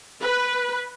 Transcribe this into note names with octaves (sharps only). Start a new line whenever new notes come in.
B4